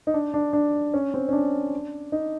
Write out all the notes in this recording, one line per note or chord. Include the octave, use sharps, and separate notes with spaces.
D#4
D4
D4
D4
C#4
C4
C#4
D4
D#4